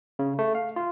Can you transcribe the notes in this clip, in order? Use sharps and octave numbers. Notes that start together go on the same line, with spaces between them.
C#3
A3
F5
F4